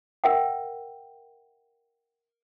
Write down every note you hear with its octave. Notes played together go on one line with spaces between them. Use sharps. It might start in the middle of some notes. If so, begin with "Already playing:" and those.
A#4 E5 F#5 G5